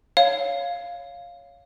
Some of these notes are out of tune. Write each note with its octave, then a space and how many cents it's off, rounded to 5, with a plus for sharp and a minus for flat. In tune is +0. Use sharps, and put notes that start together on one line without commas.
C#5 +5 F5 +0